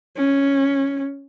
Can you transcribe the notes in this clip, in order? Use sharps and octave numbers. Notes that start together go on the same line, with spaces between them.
C#4